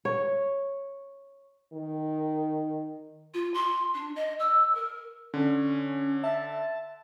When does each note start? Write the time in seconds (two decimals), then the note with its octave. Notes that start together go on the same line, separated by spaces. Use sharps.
0.05 C#5
1.73 D#3
3.34 F4
3.54 C6
3.94 D4
4.16 D#5
4.39 E6
4.75 A#4
5.34 D3 C#4
6.23 E5 A5